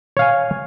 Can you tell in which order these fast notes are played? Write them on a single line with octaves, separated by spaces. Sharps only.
C#5 F5 G#5